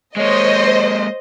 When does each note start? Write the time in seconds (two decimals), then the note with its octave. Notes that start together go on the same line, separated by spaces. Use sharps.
0.16 G#3 A#3 C5 C#5 D#5